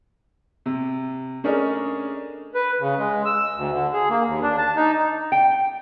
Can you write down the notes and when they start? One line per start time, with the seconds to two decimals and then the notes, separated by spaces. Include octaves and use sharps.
0.66 C3
1.44 A3 C#4 D4 G#4 A#4 D#5
2.55 B4
2.80 C#3
2.98 G#3
3.25 E6
3.55 D2
3.73 D3
3.93 G#4
4.09 A#3
4.25 D#2
4.43 D4
4.58 A5
4.76 D#4
5.32 G5